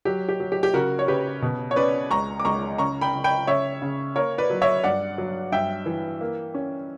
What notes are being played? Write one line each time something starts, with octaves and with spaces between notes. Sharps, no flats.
F#3 G4
G4
F#3
G4
G4
C#3 F#4 A#4
C#5
C#3 G4 B4
B2
C#5
C#4 B4 D5
C#2 A#5 C#6
D6
C#2 A#5 C#6
C#3 A#5 C#6
G5 B5
C#3
G5 B5
C#3 C#5 E5
C#3
A#3 A#4 C#5
B4 D5
F#3
C#5 E5
G2 D5 F#5
F#3
G2 E5 G5
E3
A#3
C#4